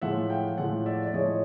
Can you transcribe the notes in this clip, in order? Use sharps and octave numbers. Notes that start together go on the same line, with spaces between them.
A2 F3 G#3 E5 F#5
F5 G5
A2 F3 G#3 E5 F#5
D5 E5
D5
A2 F3 G#3 C#5 D#5